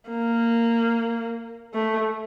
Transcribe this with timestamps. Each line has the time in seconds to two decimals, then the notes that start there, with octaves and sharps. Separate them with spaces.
0.09 A#3
1.74 A3